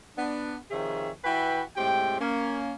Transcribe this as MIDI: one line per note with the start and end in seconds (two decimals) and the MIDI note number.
0.17 0.55 59
0.17 0.55 62
0.71 1.10 48
0.71 1.10 51
0.71 1.10 53
0.71 1.10 68
0.71 1.10 73
0.71 1.10 76
1.24 1.62 52
1.24 1.62 64
1.24 1.62 66
1.24 1.62 71
1.24 1.62 79
1.77 2.17 45
1.77 2.17 56
1.77 2.17 60
1.77 2.17 67
1.77 2.17 79
2.19 2.73 58
2.19 2.73 61